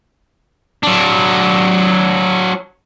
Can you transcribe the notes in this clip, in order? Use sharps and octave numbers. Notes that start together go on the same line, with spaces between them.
F#3 D4